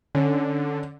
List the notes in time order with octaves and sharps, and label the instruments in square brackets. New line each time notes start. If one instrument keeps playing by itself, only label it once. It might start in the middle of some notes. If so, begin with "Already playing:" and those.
[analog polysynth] D3 [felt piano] C#4